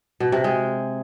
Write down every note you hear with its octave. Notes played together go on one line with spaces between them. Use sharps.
B2
C3
G#3